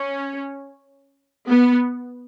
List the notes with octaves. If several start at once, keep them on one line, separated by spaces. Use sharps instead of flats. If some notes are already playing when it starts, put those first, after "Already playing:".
Already playing: C#4
B3